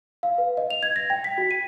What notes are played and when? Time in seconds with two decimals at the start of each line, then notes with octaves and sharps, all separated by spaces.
0.23 F5
0.38 B4
0.57 D#5
0.70 F7
0.83 G#6
0.96 A#6
1.10 G5
1.24 B6
1.38 F#4
1.51 D#7